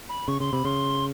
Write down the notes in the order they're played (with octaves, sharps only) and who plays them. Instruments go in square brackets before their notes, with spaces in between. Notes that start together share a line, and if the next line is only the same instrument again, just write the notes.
[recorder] B5
[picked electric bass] C#3 [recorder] C#6
[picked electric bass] C#3 [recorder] C6
[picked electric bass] C3 [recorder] B5
[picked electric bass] C#3 [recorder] C6